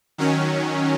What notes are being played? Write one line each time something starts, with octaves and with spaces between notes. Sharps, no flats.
D#3 F#3 C#4